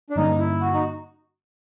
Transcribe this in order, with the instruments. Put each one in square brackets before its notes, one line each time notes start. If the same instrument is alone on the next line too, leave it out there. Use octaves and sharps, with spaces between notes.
[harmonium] D4
[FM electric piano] G2 D3 G3 A#3 C#4 [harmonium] D#4
[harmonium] E4
F#4
D#4